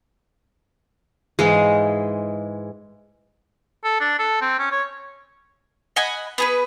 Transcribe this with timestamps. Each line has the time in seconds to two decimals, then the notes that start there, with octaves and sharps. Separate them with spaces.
1.39 G#2 E3 G#3 F5
3.84 A4
4.00 D4
4.19 A4
4.42 C4
4.59 C#4
4.71 C#5
5.96 D#5 F#5 G#5 B5
6.38 B3 G#4 B4